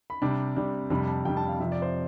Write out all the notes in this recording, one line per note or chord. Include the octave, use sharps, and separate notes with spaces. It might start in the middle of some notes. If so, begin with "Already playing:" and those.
B5
C3 G3 D4
C3 G3 D4
F2 C3 G3 D4 B5
A5
F2 C3 G3 D4 G5
A5
F5
F2 C3 F3 E5
D5
C5